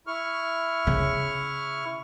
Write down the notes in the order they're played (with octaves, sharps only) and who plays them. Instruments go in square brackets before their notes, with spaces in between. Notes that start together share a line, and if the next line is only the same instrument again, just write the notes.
[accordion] E4 C#6 F6
[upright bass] C#3